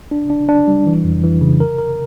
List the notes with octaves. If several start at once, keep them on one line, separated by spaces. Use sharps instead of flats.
D4
D4
D4
G3
E3
F2
E3
C#3
A#4
A#4